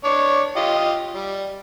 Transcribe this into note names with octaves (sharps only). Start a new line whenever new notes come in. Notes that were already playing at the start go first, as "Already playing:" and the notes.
D4 C#5 D6
F4 G4 D#5
G3